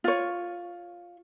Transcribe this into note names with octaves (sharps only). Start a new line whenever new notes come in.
F4 C#5